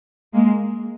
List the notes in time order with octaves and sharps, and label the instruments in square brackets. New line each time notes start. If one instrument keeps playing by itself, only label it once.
[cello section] G#3 A#3